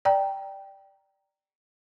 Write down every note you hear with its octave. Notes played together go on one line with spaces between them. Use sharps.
D5 G5 A#5